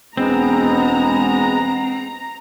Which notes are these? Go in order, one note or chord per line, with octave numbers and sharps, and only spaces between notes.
E1 G#3 B3 C4 A#5